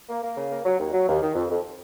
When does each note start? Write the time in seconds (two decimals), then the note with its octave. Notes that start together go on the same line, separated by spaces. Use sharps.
0.09 A#3
0.23 A#3
0.37 C#3
0.51 A#3
0.65 F#3
0.79 D#2
0.93 F#3
1.08 D#2
1.22 D#3
1.35 F2
1.49 F2